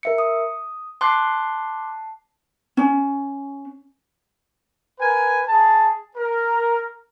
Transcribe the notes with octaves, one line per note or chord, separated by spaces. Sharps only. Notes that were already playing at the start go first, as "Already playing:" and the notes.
A#4 E5 C#7
D#6
A5 C6 D6 F#6 C7
C#4
A#4 B4 G#5
G#4 A5
A#4